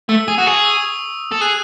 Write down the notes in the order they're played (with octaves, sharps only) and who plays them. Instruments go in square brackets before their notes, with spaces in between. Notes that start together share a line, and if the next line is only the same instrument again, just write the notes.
[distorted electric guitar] A3 [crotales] E6
[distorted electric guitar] G#4 [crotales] D#6
[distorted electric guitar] F#4
[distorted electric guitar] G#4 [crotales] C#6
[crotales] E6
D#6
[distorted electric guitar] A4
[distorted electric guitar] G#4 [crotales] F#6